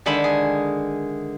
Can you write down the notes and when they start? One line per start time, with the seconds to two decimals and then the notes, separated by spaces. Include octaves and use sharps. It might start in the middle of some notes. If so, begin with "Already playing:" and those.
0.06 D3 D#3 G#3 E5 B5
0.24 G#4